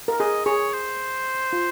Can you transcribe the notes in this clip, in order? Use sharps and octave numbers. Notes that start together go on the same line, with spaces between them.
A#4
G#4 D#5
G#4 C#5
C5
F4